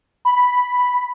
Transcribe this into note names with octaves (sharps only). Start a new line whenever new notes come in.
B5